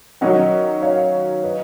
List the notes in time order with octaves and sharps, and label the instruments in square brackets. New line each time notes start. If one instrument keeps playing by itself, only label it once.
[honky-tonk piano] D#3 F#3 C#4 [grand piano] D#5 F#5
[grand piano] C#5 F5
B4 D#5